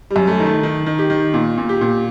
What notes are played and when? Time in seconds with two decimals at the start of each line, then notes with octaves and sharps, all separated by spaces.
0.10 G3
0.16 F#2
0.27 A3
0.40 D#3
0.46 A3
0.63 D#3
0.86 D#3
0.99 G4
1.10 D#3
1.34 A#2
1.58 A#2
1.69 G4
1.81 A#2